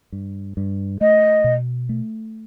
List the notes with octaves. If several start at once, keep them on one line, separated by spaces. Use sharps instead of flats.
G2
G2
A3 D#5
B2
A3